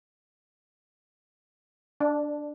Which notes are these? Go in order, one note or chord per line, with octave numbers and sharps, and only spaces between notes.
D4